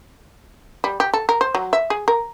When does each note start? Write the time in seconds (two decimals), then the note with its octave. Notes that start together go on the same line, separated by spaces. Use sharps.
0.84 G3
1.00 G4
1.14 A4
1.29 A#4
1.41 C5
1.55 F#3
1.73 E5
1.90 G#4
2.08 A#4